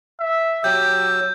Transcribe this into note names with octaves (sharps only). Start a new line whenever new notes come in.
E5
F#3 G4 E6 G6